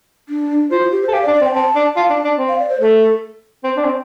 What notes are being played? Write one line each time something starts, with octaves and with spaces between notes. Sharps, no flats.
D4
F4 C5
F4
G4
C5
A4
G4 F5
D5
D4
D5
C4
G5
C4 A5
D4
F4 A5
D4
D4
C4
F5
D5
C5
A3 A4
C4
D4
C4